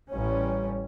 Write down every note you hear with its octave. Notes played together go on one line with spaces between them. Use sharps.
A1 G3 C#4